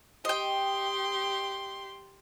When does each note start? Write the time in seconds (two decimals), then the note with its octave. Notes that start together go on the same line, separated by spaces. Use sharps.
0.25 G4 D#5 G5 C6